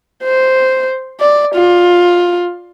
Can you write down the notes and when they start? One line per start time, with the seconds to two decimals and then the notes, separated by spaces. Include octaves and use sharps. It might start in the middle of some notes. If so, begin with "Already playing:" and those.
0.24 C5
1.20 D5
1.55 F4